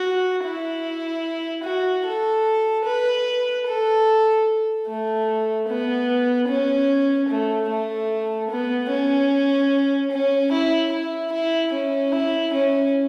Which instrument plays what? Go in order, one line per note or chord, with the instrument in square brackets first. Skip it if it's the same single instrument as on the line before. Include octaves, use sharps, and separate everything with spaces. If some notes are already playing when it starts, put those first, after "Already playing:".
Already playing: [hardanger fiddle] F#4
E4
F#4
A4
B4
A4
A3
B3
C#4
A3
A3
B3
C#4
C#4
E4
E4
E4
C#4
E4
C#4